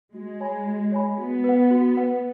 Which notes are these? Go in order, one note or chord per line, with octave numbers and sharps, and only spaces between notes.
G#3 F#4
C#5 G#5 B5
F#4
C#5 G#5 B5
B3 F#4
B4 F#5
F#4
B4 F#5